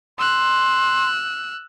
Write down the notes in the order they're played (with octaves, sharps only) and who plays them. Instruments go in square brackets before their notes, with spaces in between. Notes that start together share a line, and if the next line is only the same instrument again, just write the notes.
[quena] C6 [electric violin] E6 F#6